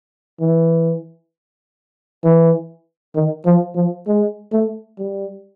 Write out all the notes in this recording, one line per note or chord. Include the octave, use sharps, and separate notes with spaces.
E3
E3
D#3
F3
F3
G#3
A3
G3